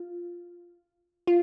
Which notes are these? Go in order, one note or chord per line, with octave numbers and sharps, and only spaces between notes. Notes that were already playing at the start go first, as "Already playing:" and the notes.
Already playing: F4
F4